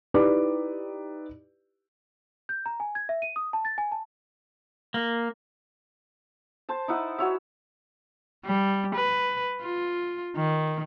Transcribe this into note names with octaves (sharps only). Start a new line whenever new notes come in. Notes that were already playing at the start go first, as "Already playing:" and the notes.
D#4 E4 G4 B4 D5 D6
G6
A#5
G#5
G#6
E5
D#7
D#6
A5
A6
G#5
A5
A#3
C5 A5
D#4 E4 F#5 D#6
F#4 C#5 E5
G3
B4
F4
D#3